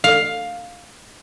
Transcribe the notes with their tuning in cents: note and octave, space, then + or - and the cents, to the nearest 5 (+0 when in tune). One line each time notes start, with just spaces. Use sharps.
F5 +10